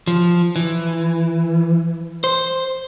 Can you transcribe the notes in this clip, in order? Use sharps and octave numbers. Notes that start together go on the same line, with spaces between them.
F3
E3
C5